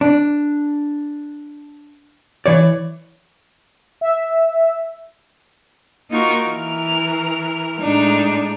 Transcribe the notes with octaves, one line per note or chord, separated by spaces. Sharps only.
D4
E3 C#5 D5
E5
A#3 D#4 F4 F#4 A#4
E3 A#4 F6
A2 G#3 D4 D#4